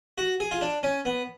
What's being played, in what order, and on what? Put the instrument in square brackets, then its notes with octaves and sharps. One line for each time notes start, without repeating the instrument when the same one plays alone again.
[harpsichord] F#4
G#4
F4
D4
C#4
B3